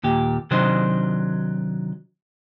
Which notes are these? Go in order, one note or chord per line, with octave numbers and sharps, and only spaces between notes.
D#2 A#2 G4
C3 D#3 F#3 D4 C5 D#5